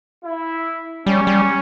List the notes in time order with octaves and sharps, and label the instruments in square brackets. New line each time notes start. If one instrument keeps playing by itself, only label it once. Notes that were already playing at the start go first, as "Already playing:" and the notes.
[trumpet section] E4
[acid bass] G3 [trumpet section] C#4
[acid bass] G3